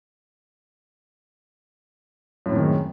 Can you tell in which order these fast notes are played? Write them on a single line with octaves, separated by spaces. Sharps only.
F#2 A2 C3 D#3 G#3